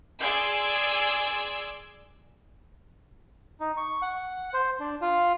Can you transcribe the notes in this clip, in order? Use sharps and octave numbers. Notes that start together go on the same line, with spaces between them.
G#4 D5 C6 E6 G#6 D7
D#4
C#6
F#5
C5
D4
F4